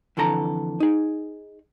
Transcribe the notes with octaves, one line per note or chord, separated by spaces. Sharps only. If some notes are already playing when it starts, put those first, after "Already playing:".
F2 D3 E3 A4 A#5
D#4 G#4